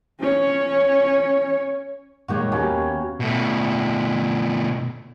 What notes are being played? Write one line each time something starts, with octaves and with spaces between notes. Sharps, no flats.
C#4 C#5
A#2 D#3 G#3 F#4 G4 C#5
D#2 B2 A#3 C#4 G4
B2 A3